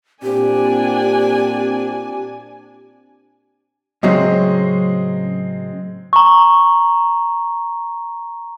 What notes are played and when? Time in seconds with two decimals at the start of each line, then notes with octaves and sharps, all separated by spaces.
0.23 A#2 C4 D4 G4 G#5
4.03 A2 C#3 F#3 G#3 C4 D#5
6.13 A#5 C#6